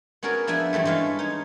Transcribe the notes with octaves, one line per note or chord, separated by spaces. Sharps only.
B3 C#4 F#4 G#4 A#4 D5
F3 B3 D4 E5 G#5
G2 E3 G3 A3
G#3 A3 C#4 C#5 F5
D#4 C#5